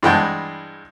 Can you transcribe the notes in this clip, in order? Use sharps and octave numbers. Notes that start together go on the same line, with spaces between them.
G2 E3 G#3 F#5 G5 A5